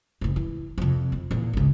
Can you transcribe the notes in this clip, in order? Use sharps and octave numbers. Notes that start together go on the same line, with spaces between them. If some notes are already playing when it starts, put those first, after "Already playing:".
F#1 A2
E3
F2 C3
C4
E2 A#2
G#1 C#2